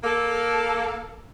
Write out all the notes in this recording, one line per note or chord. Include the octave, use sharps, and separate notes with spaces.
A#3 A4